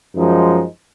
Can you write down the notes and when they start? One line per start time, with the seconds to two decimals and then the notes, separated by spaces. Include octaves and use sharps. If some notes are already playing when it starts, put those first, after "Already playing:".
0.15 F#2 F3 G#3 D#4